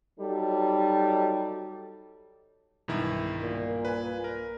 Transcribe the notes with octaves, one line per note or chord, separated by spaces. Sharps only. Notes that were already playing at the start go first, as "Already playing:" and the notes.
F#3 G3 D#4 A4
B1 E2 G2 D#3 E4
A#2
B4 G#5
A#4